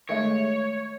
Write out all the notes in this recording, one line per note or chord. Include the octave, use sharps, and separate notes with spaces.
D#3 G#3 A3 C#5